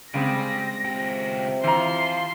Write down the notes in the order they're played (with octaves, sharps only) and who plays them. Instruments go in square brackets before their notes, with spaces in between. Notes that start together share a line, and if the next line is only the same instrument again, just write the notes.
[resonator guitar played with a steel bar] C#3 G#3 C4 [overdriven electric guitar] G4 D5 [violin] A#6
[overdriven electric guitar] C#2 G5 [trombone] C3
[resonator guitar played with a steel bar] E3 A#5 [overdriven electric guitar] C5 F5 [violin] C6